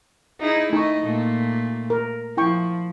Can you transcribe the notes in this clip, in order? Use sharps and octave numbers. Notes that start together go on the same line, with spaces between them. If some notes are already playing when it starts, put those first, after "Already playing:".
D#4 E4 G#4
A3 D#4 D#5 C#6
A#2 A3
A#4
F3 E4 G5 C#6